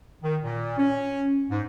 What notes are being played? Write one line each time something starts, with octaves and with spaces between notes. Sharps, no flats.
D#3
A#2
C#4
G#2